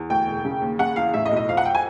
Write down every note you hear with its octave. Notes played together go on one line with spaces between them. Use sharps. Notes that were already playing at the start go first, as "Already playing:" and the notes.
Already playing: E2
D2 G5
E1
C#3
D#2
C#3 F#5
E2 F5
A2 E5
D#5
B1
D#5
F2 F5
F#5
G5
G#5